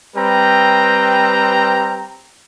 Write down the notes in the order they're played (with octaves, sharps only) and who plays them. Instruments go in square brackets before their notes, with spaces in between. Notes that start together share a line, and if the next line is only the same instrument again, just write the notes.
[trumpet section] G3 C4 B4 G5 A#5